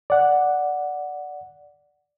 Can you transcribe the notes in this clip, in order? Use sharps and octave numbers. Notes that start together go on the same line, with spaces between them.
D5 F#5